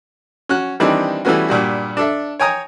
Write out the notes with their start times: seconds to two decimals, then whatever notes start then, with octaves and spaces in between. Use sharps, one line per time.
0.49 C#4 F#4 F#6
0.80 D#3 E3 G3 C4 D4 D#4
1.25 E3 G3 A3 B3 C#4 F#4
1.48 G2 A#2 G3 F#4
1.97 D4 A4 E5
2.39 C#5 G5 G#5 A#5 D#6